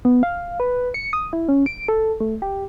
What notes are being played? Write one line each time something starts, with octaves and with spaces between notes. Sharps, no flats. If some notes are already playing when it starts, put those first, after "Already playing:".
B3
F5
B4
C#7
D#6
E4
C#4
D7
A4
A3
G4